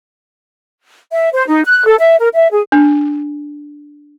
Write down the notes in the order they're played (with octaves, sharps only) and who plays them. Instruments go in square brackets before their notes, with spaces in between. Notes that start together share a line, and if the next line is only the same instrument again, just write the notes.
[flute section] E5
C5
D#4
F#6
A4
E5
A#4
E5
G#4
[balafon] D4